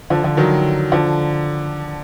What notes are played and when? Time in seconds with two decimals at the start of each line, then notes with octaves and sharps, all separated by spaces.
0.10 D3 F3
0.24 D3 F3
0.37 D#3 F#3
0.92 D3 F3